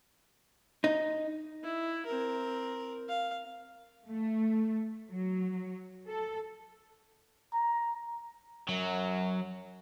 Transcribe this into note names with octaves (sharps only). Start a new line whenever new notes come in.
D#4
E4
C4 A#4
F5
A3
F#3
A4
A#5
F#2 F#3